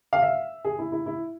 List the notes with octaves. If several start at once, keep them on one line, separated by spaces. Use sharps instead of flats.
F5
E5
G#4
E4
E4
E4